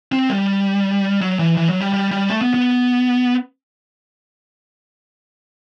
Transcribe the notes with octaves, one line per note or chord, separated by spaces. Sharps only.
C4
G3
F#3
E3
E3
F#3
G3
G3
G3
A3
B3
B3